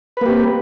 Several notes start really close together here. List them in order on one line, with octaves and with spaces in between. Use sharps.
B4 A#3 G4 C4